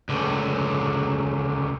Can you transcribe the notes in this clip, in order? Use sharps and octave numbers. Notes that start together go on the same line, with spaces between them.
C#2 D3